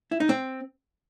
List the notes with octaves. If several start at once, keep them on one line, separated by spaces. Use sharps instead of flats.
E4
D#4
C4